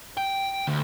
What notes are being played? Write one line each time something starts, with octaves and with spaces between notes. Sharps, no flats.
G5
D2